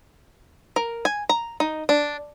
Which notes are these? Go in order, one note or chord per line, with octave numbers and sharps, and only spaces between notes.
A#4
G#5
A#5
D#4
D4